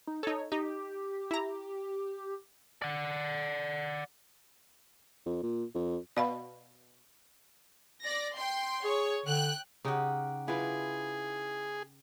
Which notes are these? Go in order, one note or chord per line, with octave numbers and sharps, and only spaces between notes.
D#4
D#4 A4 C#5
D#4 G4
E4 A#5
D5 F#5
F2
A#2
F2
B2 D5 F5 B5
D5 A#6
G5 C6
G#4 C#5
D3 G5 F#6
C#3 D#4 G4 F#5
E4 F4 G#4 B4